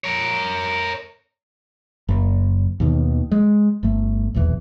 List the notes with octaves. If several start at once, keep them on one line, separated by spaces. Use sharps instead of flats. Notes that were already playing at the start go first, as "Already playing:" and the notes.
A#4 C#5
F#1
D#2 B2 D#3
G#3
G1 A3
D#1 B1 E2 E3